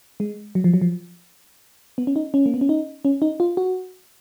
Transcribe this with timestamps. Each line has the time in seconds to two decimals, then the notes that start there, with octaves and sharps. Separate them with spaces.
0.20 G#3
0.55 F#3
0.64 F3
0.74 F#3
0.82 F3
1.98 B3
2.07 C#4
2.16 D#4
2.34 C#4
2.46 A#3
2.54 B3
2.61 C#4
2.69 D#4
3.05 C#4
3.22 D#4
3.40 F4
3.57 F#4